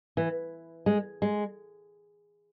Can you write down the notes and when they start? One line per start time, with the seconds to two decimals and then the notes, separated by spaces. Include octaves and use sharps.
0.17 E3
0.86 G#3
1.22 G#3